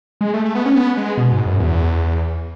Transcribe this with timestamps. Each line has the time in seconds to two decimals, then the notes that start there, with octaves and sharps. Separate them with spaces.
0.21 G#3
0.34 A3
0.45 A3
0.55 B3
0.66 C#4
0.75 B3
0.97 G#3
1.17 B2
1.32 G#2
1.46 F#2
1.60 E2